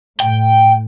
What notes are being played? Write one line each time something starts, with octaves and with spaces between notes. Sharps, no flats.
A2 G5